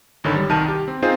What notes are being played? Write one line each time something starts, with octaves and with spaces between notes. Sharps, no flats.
G#1 D3 D#3 C#5 B5
G3
C2 D#3 A#4 A5 D#7
G4
C4
C4 D#4 F4 G#4 C5